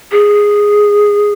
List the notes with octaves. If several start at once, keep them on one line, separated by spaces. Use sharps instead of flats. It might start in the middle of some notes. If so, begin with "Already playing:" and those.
G#4